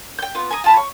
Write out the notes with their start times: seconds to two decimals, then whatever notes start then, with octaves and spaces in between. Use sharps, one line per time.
0.18 G5 G6
0.35 B3 F4
0.50 G#5 A#5 B5 D#6
0.64 F4 A5 B5
0.76 C#5